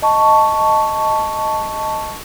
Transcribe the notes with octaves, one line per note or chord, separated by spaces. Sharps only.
D#5 A5 C#6